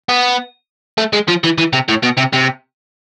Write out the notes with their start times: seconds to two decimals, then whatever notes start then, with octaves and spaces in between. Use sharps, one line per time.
0.09 B3
0.98 A3
1.13 G#3
1.28 F3
1.44 E3
1.58 E3
1.73 C3
1.89 A2
2.03 B2
2.18 C3
2.33 C3